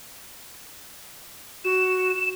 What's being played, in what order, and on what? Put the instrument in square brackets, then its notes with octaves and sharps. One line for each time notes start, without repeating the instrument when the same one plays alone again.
[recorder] F#4 [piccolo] E7